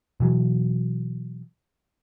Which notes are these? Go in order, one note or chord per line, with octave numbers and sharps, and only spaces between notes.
B2 E3 F#3